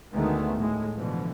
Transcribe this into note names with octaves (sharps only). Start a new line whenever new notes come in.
D2 D3 D#3 G#3 A3 B3
A2 G#3
B2 D3 E3 F3